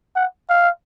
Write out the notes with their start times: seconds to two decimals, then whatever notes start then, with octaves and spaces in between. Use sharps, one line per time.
0.16 F#5
0.49 F5